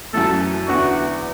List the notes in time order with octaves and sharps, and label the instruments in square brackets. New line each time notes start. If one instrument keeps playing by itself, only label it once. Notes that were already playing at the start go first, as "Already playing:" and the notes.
[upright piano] F#2 E3 A3 [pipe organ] A4
[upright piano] E2 D3 B3 E4 [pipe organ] F#4